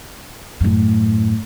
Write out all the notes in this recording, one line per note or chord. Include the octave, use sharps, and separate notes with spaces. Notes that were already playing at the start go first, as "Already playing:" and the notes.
F#2 A2